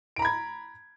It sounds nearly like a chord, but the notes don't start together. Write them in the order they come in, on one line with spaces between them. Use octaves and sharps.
D7 A#5 B5 G#6